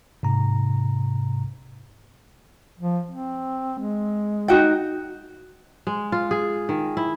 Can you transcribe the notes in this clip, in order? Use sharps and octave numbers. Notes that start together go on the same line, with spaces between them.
G#2 C3 A#5
F3
C4
G#3
D#4 F#4 G5
G#3
F4
G#4
D#3
E4